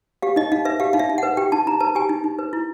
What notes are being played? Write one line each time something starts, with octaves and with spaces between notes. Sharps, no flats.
G4 F5
D#4 D#5
D#4 F5
B4 E5
G4 F5
D#4 F5
E5
D#4
B4 F#5
G4 G5
D#4 A5
D#4 A#5
B4 A5
G4 G#5
D#4
D#4
B4
E4